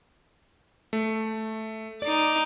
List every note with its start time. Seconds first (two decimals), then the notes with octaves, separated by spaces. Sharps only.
0.93 A3
2.02 D#4 D5 D6